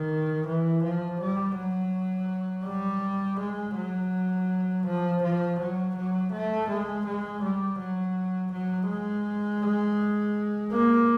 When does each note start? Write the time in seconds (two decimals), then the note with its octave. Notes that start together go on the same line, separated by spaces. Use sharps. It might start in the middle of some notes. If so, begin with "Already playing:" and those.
Already playing: D#3
0.47 E3
0.83 F3
1.20 G3
1.56 F#3
2.66 G3
3.40 G#3
3.76 F#3
4.86 F3
5.23 F3
5.60 F#3
5.96 F#3
6.33 A3
6.69 G#3
7.06 G#3
7.42 G3
7.79 F#3
8.52 F#3
8.89 G#3
10.72 A#3